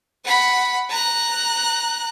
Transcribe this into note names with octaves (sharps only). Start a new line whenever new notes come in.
F#5 B5
A#5 F#6